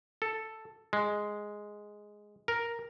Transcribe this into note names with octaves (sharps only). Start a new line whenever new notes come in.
A4
G#3
A#4